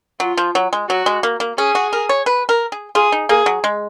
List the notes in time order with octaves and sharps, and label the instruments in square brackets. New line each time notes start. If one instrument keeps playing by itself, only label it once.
[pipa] F#3 [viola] F4
[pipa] F3
F#3
G#3
[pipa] F#3 [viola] F#4
[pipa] G#3
A#3
A#3
[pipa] C#4 [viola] G#4
[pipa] F#4
A#4
C#5
B4
A#4
G#4
[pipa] F4 [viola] G#4
[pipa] D#4
[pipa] A#3 [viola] G#4
[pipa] F#3
G#3